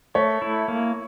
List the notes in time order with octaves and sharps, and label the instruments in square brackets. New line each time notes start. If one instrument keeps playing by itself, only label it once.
[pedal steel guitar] A3 [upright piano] C#5
[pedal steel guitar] E4
A#3